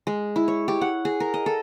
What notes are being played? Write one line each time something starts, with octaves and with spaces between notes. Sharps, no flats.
G#3
E4
C#5
G4
F#5
G#4
A#4
D#5
A4